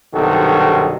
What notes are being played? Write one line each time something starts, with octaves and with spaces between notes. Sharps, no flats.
B1 G2 C3 D#3 F#4 A4